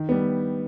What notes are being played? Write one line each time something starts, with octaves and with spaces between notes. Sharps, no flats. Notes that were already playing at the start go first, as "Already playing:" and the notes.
Already playing: D#3
G3 B3